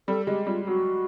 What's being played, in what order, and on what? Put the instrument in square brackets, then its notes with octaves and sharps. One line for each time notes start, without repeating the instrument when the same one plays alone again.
[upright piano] G3 [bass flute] A4
[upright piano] G#3 [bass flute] G4
[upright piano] G3 [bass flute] F4
[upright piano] F#3 [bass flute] F#4